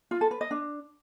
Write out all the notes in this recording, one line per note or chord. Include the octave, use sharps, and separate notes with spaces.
F4
A4
B4
D#5
D4